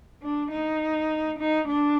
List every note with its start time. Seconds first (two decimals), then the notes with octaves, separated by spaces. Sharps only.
0.23 D4
0.51 D#4
1.39 D#4
1.68 D4